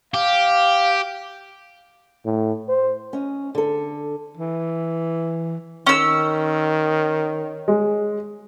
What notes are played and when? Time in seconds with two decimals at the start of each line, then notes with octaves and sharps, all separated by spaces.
0.14 G4 F5
2.25 A2
2.69 C5
3.13 C#4 D#5
3.55 D3 A4
4.37 E3
5.87 D#3 C#4 E6
7.68 G#3